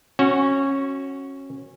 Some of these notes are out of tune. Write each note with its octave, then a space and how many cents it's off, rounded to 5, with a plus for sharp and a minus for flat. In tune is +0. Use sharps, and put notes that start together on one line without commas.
C#4 -20 F#4 +0